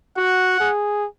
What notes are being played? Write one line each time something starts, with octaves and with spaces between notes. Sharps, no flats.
F#4 F#5
G#4